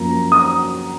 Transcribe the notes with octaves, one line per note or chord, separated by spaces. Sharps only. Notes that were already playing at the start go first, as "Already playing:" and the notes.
Already playing: F#2 F3 A#3 A#5
D#6